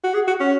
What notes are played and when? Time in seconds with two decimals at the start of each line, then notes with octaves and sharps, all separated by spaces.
0.04 F#4
0.14 G#4
0.27 F#4
0.40 C#4